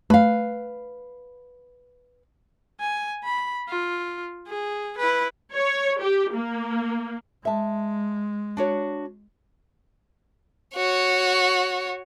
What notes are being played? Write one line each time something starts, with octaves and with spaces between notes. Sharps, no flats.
A3 B4 F5
G#5
B5
F4
G#4
E4 B4
C#5
G4
A#3
G#3 E5 A5
D4 F#4 C#5
F#4 C#5